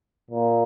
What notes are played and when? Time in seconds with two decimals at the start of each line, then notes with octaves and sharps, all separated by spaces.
0.31 A#2